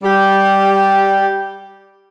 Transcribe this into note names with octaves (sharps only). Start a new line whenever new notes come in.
G3 G4